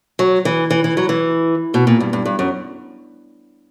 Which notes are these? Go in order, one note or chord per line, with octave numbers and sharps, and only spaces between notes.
F#3
E3
E3
E3
F#3
E3
B2
A#2
G2
G2
G2
F#2